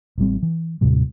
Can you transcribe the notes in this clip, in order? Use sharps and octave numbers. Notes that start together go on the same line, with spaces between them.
A1 A2 G3 C4
E3
D#2 A2 C3 G3